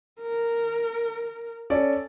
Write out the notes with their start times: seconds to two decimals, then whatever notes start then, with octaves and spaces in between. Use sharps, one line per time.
0.21 A#4
1.70 C#4 A4 D5